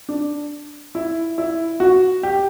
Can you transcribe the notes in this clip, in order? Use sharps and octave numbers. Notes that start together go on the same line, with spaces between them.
D4
E4
E4
F#4
G4